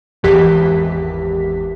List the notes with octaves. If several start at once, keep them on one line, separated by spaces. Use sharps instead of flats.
G#1 E2 E3 G4 B6